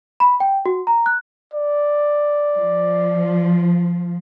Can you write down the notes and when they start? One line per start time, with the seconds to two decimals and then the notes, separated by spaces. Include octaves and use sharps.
0.20 B5
0.40 G5
0.66 F#4
0.87 A#5
1.06 F#6
1.54 D5
2.56 F3